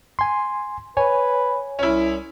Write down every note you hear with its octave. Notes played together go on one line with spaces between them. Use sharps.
G#5 C6
B4 C#5 G#5
C2 C#4 E4